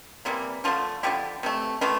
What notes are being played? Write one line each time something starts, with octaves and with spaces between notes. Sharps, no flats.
C3 E3 G3 A#3
D3 F3 A3 F4 A4
D3 F3 A3 E4 G4
C3 E3 A3
C3 E3 A3 D4 F4